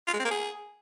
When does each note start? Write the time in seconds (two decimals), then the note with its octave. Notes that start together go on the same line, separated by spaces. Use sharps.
0.08 F4
0.14 G#3
0.19 C4
0.25 A#3
0.31 G#4